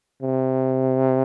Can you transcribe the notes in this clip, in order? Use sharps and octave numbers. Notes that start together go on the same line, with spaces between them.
C3